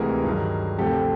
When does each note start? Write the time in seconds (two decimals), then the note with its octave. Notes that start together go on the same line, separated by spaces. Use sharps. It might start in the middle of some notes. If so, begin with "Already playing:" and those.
Already playing: D2 C3 E3 G#3 G#4 A#4
0.24 G2 D#3 F#3
0.79 D2 C3 F3 G4 A4